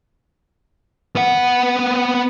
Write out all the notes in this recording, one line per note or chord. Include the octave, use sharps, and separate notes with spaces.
B3 F#5